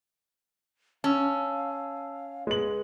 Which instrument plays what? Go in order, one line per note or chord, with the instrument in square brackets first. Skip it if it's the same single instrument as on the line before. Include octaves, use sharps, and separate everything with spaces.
[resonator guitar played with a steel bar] C#4 [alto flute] F5 [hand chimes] A5 E6
[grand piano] G#3 F#7 [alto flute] B4